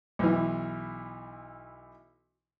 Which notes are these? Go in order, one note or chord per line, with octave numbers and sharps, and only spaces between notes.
B1 E3